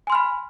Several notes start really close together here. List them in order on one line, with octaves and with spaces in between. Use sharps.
G#5 C6 F6 B5